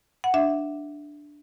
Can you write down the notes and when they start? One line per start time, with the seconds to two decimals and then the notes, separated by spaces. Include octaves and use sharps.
0.24 F#5
0.34 D4 E5